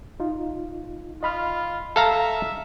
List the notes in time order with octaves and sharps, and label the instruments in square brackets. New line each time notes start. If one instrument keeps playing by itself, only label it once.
[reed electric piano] D#4 F4
[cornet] F4 [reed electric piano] D#5 B5 F6
[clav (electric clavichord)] A4 F5 A#5 [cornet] E5